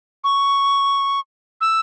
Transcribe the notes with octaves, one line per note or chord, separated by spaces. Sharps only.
C#6
E6